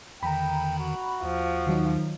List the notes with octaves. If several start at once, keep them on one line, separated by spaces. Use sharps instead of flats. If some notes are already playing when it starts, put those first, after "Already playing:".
E2 D3 D#3 G5 A#5 B5
F#4
D#2 F3
D#3 F#3 D#4